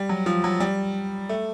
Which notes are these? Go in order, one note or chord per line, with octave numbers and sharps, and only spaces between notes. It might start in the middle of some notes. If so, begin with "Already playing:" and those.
Already playing: G3
F#3
F3
F#3
G3
A3